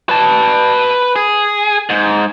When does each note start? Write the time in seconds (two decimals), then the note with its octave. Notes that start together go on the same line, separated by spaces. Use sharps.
0.09 B4 A5
1.16 G#4
1.90 G#2